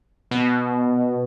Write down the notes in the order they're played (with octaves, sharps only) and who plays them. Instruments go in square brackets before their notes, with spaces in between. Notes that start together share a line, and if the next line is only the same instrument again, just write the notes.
[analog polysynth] B2